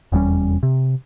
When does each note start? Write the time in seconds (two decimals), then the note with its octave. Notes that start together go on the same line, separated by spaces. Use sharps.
0.12 F1 E2 G3 C#4
0.63 C3